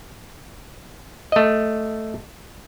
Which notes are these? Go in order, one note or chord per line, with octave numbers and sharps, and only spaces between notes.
A3 D#5